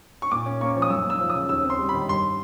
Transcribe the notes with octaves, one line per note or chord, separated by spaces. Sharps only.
C#6
A#2 D6
C#4
A#3 C#6
F3
D#6
F#2 E6
A#3
E6
F3
D#6
C#3
D#2 E6
C4
C6
G3
B5
D#3
G2 C6